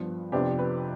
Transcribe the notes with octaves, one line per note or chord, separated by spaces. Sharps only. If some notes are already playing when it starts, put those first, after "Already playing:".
Already playing: G2 F3 B3
F2 C3 F3 B3 D4 G4
B4